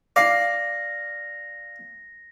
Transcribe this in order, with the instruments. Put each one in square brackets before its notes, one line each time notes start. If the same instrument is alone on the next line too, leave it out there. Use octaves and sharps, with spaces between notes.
[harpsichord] D5 [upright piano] F5 C7 [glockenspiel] A#6